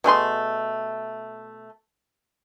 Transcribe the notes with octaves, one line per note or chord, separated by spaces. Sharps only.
B2 A3 G#4 C6